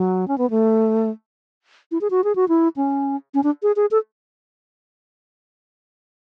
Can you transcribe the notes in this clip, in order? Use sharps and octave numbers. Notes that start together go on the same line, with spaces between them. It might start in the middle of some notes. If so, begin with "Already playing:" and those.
Already playing: F#3
C#4
B3
A3
E4
G#4
F#4
G#4
F#4
E4
C#4
C#4
D4
G#4
G#4
A4